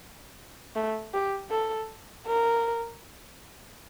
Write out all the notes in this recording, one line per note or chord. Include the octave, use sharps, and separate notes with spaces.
A3
G4
A4
A#4